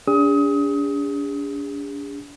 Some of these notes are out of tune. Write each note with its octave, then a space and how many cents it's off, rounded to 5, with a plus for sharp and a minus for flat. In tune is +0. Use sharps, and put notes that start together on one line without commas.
D4 -40 G#4 -40 D#6 +30